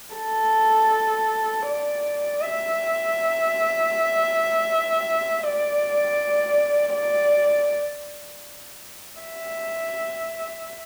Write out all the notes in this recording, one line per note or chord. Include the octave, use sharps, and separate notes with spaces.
A4
D5
E5
D5
D5
E5